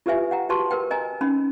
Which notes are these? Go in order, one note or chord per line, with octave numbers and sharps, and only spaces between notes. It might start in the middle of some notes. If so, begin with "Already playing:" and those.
F4 G4 A4 B4 E5 G#5
F#5 G5 A#5
F#4 G4 B4 A5 C6 C#6
A#4 B4 G5
A#4 D#5 G#5 A#5
C#4 D#4 B5